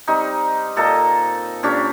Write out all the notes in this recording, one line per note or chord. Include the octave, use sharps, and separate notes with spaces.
G3 C4 D#4
A#2 A4 D#5 A#5
A#2 C#4 D4 G4